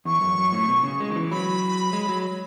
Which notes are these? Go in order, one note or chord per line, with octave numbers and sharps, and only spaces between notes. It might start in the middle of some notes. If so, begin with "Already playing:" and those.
E2 C#6
F#2
F#2
A2
B2
C#3
G#3
D#3
E3
F#3 B5
G#3
F#3